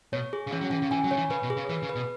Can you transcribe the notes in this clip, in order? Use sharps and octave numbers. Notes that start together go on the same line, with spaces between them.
B2 C#5
G#4
C#3
E3 C#4
F#3
E3 C#4
C#3
E3 G#5
F#3
C#3 C#5
E3
C#3 B4
B2
G#4
C#3
E3 B4
C#3
B4
B2